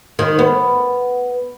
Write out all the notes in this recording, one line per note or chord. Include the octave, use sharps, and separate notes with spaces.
D#3
B3